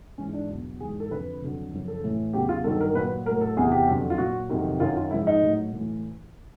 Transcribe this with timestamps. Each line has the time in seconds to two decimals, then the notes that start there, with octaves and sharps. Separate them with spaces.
0.18 G#2 E3 C#4
0.33 D4
0.49 E2 B2 F#3
0.80 G#2 E3 G#4
1.00 A4
1.11 F2 D3 F3 B4
1.42 F2 D3 F#3
1.73 F#2 C#3 F3
1.88 A4
2.04 A2 E3
2.33 E2 C#3 F#3 G4
2.49 F4
2.64 G2 D#3 F#3 A4
2.81 A#4
2.95 A#2 B4
2.99 F#3
3.26 F#3 A#4
3.30 A2
3.41 A4
3.57 E2 C3 E3 G#4
3.72 G4
3.87 F2 D3 F#3
4.10 F4
4.18 A#2 F#3 F#4
4.50 F2 C3 D#3 F#3
4.80 F#2 D#3 F#3 F4
4.96 F4
5.11 G#2 F3 E4
5.27 D#4
5.42 A2 F#3
5.73 A2 E3